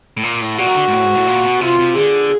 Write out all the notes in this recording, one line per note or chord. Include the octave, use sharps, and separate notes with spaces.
A2
A#2
A2
A#2 F#4
D#3
D3
G#2
A2
G#2
A2
A#2
B2
C3 F4
C3
D3 G#4